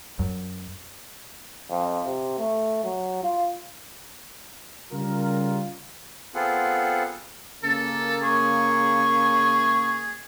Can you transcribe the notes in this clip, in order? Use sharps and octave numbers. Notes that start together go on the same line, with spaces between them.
F#2
F2
C3
A3
F#3
F4
C#3 G3 F4 A#4
B3 C4 F4 G#4 A4 F#5
C#3 A#3 A4
G#4 C#6